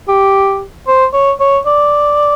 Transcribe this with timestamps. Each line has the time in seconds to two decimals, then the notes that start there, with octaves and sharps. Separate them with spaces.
0.08 G4
0.87 C5
1.13 C#5
1.40 C#5
1.66 D5